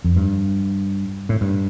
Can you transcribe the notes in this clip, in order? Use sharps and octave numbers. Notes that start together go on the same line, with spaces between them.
F2
G2
A2
G2